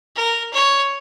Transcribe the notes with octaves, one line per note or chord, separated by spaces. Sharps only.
A#4
C#5